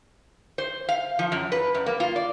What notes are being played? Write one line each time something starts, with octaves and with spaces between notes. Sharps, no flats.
C5
F5
F3
F#2
B4
F#2
A#3
F4
D5